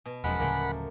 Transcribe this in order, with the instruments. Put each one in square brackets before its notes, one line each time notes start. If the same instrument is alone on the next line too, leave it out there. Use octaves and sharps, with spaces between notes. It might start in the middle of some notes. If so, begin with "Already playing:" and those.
[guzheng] B2
[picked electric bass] E1 [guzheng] F#2 F3 G#3 [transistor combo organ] F#5 B5
[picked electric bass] D1 C#3 [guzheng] A3 A#3